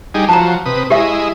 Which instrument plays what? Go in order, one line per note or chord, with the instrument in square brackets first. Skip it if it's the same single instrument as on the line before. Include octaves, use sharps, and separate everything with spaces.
[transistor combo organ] G3 D#4 G#4
[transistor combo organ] F3 F#3 [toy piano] A5 A#5
[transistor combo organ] C3 B4 D#6
[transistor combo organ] G#3 E4 D#5 [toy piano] G4 E5